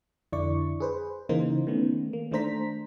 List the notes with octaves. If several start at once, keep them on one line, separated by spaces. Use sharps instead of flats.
F2 D3 E4 D5 C#6
G#4 B4 C5
C#3 E3 A#3 D#4 C5
D#3 A3 B3 C#4
A#3
D#3 A3 D4 C5 A#5 B6